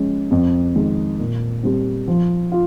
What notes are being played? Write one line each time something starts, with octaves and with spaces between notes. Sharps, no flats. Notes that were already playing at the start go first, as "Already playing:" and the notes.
Already playing: F3 G#3 C#4
F2
D#3 G#3
A#2
G3 C4
F3
F4